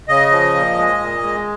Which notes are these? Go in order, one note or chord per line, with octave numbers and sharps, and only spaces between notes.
C#3 D#5
F3
A#2
G#3
A#2
G#3